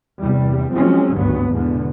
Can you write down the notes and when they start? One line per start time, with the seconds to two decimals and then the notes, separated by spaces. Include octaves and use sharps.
0.20 E2 G2 C3 G3
0.73 F3 F#3 G#3 C4 C#4
1.14 G#1 D2 G2 F#3 B3
1.52 E2 G#2 B2 D3 B3